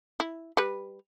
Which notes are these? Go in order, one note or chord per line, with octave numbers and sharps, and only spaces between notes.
E4
G3 B4